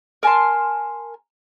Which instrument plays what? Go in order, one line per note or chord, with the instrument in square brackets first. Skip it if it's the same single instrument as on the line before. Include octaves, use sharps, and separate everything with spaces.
[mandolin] A#4 G#5 A5 C6